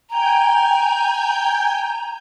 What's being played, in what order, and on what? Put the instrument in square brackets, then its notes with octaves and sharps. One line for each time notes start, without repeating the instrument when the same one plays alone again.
[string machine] G5 G#5 G6 [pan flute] A#5